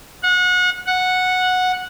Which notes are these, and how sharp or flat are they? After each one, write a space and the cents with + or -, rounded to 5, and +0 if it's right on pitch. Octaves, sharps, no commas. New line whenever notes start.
F#5 -30
F#5 -10